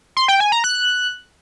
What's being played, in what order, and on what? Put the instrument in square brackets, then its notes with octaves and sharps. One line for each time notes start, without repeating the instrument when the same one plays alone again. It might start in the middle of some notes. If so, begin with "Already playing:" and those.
[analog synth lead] C6
G5
G#5
A#5
F#6